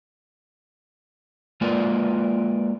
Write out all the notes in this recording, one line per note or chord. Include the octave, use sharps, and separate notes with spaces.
G#3 A#3 F4 A#4 B4 D5